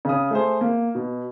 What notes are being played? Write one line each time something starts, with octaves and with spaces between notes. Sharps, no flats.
C#3 D#6
A3 G#4 C5
A#3
B2